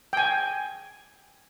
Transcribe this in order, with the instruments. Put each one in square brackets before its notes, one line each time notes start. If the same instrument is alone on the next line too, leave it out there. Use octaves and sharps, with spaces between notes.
[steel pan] G5 G#5